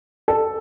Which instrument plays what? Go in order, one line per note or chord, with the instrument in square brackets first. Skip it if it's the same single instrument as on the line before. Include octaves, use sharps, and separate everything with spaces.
[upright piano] A4